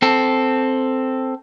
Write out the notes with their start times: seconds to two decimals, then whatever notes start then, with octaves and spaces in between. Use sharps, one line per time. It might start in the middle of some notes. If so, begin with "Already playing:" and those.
0.02 C4 A4